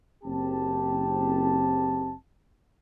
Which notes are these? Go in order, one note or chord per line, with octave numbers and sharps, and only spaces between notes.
F#1 C4 G4 A5